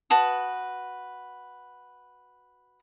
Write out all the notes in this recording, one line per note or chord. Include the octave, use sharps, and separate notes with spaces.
F#4 B4 A5 D#6